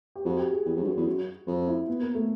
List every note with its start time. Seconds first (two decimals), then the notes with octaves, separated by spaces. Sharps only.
0.16 G4
0.25 F2 F#4
0.39 G4
0.52 G#4
0.66 E2 G4
0.77 F2
0.82 G2 F4
0.86 F#2 F#4
0.97 E2
1.06 F#2
1.47 F2 F4
1.67 E4
1.88 B3
2.01 A#3
2.15 A3